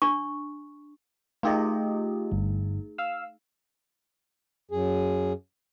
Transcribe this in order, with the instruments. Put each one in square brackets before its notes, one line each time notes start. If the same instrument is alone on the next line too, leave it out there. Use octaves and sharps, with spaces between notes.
[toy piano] D4 C#6
[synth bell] A3 D#4 G#4 [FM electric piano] F4 G4 D#5
[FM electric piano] G1
F5 E6
[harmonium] F#2 G#4